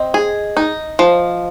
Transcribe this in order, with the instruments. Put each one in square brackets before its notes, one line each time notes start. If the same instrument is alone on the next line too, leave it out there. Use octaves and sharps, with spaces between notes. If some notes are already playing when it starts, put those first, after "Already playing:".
Already playing: [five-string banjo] C4 [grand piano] D#5
[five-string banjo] G#4
D#4
F3